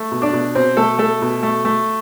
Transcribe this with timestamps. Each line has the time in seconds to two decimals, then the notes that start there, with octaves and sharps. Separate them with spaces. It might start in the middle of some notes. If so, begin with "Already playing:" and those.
Already playing: A3
0.12 B2
0.22 D4 D5
0.33 B2
0.55 B2 C4 C5
0.77 B2 A3 A4
0.99 A3 A4
1.22 B2
1.43 A3
1.65 A3